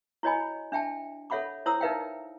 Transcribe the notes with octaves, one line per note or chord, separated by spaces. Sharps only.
E4 F#4 C#5 D#5 G#5 B5
D4 E5 G5 A5
A4 C#5 E5 F#5 B5 D6
E4 C5 C#5 A#5 D#6 E6
D#4 A#4 B4 E5 F5 G5